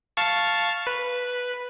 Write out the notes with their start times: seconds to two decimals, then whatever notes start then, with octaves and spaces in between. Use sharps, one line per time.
0.17 F5 A5 C#6
0.87 B4